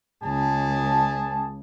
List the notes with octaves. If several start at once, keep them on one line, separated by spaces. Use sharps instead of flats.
C#2 G#4 A5